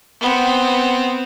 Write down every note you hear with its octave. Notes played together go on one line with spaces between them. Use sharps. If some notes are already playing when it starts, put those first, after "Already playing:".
B3 C4